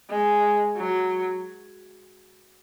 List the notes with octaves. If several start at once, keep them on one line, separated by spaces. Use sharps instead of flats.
G#3
F#3